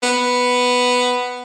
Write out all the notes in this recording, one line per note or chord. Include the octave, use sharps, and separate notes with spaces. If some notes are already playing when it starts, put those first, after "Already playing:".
B3